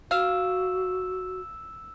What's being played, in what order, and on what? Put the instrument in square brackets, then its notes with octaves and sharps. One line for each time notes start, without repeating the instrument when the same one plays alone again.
[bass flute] F#4 [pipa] F5 [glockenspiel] E6 E7